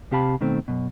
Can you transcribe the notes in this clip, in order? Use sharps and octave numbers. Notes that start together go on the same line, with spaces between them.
C3 C4 G4 F5 A5 B5
B2 D#3 A3 C4
F#2 B2